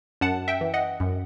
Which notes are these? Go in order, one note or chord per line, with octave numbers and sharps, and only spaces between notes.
F#2 F#5 A5
E5 G5
E3
D#5 F#5
F#2